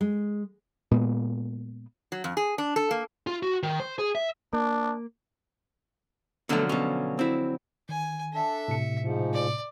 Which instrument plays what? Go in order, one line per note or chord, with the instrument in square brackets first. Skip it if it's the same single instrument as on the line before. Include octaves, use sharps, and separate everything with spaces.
[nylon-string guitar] G#3
[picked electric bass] A#2 G#3 B3
[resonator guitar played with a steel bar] F#3
F2
G#4
D4
A4
A#3
[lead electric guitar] F4
F#4
D#3
C5
G#4
E5
[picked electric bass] A#3 [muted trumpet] D4
[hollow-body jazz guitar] B2 A3 [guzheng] D3 F3 F#3
[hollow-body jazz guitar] B2 C#4
C4 E4
[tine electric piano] D#3 [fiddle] G#5
[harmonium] D4 A4 [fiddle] E5
[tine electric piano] A2 C3 C#7
[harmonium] G#2 F3
[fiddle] D5